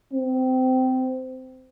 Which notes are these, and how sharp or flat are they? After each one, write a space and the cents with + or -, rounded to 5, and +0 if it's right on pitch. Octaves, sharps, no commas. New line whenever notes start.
C4 -20